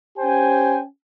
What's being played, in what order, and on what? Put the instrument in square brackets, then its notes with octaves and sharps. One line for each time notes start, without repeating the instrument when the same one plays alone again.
[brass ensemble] C#4 G4 C5 G5 G#5